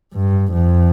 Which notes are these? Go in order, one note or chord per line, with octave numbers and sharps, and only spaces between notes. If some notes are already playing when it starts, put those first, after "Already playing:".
G2
F2